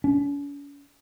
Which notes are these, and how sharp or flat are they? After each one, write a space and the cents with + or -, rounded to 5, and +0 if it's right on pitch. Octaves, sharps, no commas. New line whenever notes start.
C#4 +45